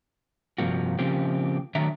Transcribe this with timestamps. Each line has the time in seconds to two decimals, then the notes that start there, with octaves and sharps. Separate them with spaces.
0.58 G2 C3 F3 A#3 F#4
0.99 C#3 F3 A#3 C4 G4
1.75 D#3 F#3 A3 D4 E5 A#5